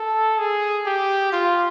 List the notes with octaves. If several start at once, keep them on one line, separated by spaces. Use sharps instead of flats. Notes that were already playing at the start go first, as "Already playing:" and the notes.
Already playing: A4
G#4
G4
F4